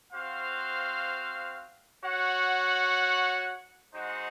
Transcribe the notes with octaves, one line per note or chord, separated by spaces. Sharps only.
C4 F#4 C5 F5
F#4 C#5 F#5
G#3 D#4 F#4 C5 F#5